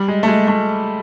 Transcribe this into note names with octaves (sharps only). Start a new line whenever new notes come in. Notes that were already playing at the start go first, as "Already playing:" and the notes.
Already playing: G3
G#3
A3
G#3
A3